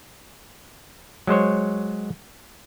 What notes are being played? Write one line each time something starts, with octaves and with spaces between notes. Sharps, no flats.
F#3 G#3 C5 C#5